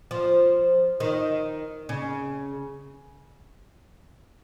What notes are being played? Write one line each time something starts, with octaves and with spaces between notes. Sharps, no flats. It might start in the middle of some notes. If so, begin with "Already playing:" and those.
F3
D#3
C#3